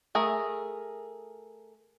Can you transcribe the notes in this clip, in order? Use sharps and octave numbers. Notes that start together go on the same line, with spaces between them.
A3 G#4 A#4